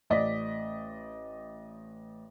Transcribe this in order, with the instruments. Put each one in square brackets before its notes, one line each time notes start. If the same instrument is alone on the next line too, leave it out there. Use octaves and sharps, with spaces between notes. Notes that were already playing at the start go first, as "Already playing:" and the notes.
[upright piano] A1 D5 D#5 B6